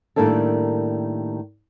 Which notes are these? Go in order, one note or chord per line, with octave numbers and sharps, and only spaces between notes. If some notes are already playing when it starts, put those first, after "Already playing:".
A2 D#3 G3 A#3 D4 A4